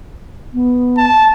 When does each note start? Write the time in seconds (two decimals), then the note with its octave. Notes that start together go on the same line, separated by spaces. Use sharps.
0.54 B3
0.97 A5